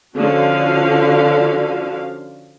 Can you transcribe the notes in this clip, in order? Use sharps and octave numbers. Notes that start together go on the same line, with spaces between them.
D3 F3 C#4 D4 F#4 F5